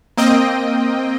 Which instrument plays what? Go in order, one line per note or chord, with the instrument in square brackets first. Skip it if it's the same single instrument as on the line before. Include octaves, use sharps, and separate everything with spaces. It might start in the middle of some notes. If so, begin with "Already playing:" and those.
[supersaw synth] A#3 C4 D#5 G5